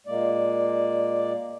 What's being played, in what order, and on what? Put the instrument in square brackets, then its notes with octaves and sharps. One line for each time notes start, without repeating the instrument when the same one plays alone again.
[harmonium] A#2 G#3 A#3 D5